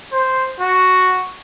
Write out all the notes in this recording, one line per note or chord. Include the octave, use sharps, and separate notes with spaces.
C5
F#4